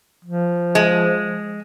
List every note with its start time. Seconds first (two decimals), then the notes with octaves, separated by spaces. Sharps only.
0.25 F3
0.75 G#3